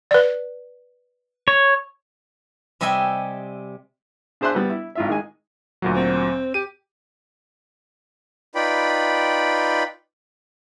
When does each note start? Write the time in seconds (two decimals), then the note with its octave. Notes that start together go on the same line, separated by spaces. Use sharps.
0.11 B4 D5
1.48 C#5
2.81 C3 G3 D#5 E5 G#5
4.41 D4 G#4 C5 E5 C6 F#6
4.55 G3 B3
4.69 E4
4.95 G#1 F4 E5
5.08 D#3 G#3 G#5
5.82 D2 A#2 F#3
5.95 C4
6.54 G4 D#7
8.55 D#4 F4 B4 D5 G5 B5